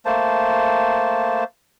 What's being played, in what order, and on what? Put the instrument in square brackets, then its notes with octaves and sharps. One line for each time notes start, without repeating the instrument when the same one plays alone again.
[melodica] A3 A#3 C5 A5